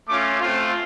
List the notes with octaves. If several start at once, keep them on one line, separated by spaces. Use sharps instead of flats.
A3 C#4 F4 D6
A3 C4 F4